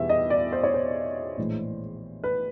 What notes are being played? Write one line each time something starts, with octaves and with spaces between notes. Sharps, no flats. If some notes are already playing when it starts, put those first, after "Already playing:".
Already playing: E2 B2 G3 E5
D#5
D5
C5
C#5
C5
A#1 A2 E3 G#3
B4